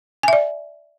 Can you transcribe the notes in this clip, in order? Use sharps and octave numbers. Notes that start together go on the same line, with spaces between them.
D5 E5 G#5